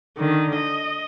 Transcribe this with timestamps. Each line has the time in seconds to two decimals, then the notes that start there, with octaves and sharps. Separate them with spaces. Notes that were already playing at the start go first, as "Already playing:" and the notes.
0.17 D3 D#3
0.55 D#5